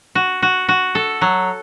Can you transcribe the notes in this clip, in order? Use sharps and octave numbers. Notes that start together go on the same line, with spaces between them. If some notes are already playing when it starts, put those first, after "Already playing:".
F#4
F#4
F#4
A4
F#3